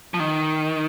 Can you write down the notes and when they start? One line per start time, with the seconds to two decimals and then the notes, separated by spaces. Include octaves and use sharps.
0.14 F3
0.20 D#3